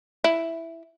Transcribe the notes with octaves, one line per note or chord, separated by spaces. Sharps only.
E4